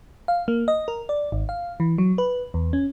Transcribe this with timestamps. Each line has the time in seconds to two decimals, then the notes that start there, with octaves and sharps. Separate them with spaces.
0.28 F5
0.48 A#3
0.68 D#5
0.88 A#4
1.09 D5
1.32 G#1
1.49 F5
1.80 E3
1.98 F#3
2.18 B4
2.54 E2
2.73 C#4